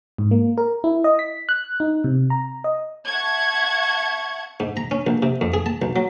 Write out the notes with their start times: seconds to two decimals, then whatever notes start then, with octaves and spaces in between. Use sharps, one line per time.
0.18 G#2
0.31 A#3
0.58 A#4
0.84 E4
1.04 D#5
1.19 B6
1.49 F#6
1.80 D#4
2.04 C3
2.30 A#5
2.64 D#5
3.05 E5 F#5 A5 C#6 G#6
4.60 G#2
4.77 A#5
4.91 C#4
5.07 A#1
5.22 C3
5.41 F2
5.54 G#4
5.66 A5
5.82 B1
5.96 F#3